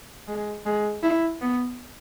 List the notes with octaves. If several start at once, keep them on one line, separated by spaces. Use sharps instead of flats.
G#3
G#3
E4
B3